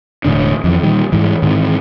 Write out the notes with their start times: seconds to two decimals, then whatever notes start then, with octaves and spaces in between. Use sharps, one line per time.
0.25 E1 A2 D3 D4
0.64 F2 E3
0.83 A#2 D#3 G3
1.12 G#2 E3
1.42 G#2 D#3 E3 C4